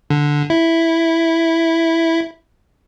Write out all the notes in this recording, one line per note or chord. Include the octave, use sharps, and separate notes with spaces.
D3
E4